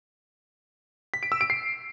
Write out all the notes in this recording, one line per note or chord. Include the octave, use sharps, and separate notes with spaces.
B6
D7
E6
D7
C7